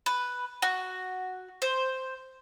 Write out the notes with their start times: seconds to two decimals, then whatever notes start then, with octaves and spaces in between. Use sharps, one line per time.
0.06 B4
0.62 F#4
1.62 C5